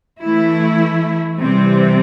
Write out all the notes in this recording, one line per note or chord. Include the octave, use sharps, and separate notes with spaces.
E3 A3 E4
C3 E3 G3 C4